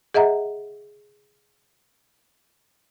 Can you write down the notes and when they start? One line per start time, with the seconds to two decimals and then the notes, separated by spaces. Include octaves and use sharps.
0.14 G#4 D#5 E5 F#5 A#5